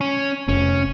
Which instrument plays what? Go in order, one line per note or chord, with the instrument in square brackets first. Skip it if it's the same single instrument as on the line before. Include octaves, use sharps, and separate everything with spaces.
[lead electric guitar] C#4
[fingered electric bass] F1 [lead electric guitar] C#4